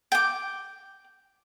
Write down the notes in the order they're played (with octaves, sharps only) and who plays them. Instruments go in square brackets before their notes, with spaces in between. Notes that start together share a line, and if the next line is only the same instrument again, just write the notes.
[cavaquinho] G5 D6